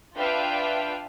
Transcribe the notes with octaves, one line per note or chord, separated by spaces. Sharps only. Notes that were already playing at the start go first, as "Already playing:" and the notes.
D4 F4 B4 E5 F5 G5